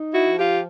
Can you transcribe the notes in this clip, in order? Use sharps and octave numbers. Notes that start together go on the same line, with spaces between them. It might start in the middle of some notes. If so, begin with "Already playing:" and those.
Already playing: D#4
E4 F#4
F3
F4 G4